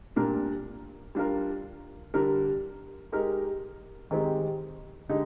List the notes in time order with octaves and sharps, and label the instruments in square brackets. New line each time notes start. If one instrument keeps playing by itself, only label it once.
[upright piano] A#2 G3 D4 G4 A#4
G3 D4 F4 A#4
D3 G3 D4 G4 A#4
G#3 D#4 G4 A#4
D#3 G#3 C4 G4
D3 G#3 D#4 G4